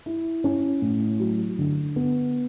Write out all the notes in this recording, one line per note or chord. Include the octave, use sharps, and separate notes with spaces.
E4
C#4
A2
F#3
D3
B3